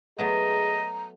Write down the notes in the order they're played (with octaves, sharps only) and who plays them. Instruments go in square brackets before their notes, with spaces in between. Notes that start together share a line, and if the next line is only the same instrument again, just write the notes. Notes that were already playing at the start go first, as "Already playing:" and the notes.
[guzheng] F#3 A3 B3 [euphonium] G#4 [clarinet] D#5 [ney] A#5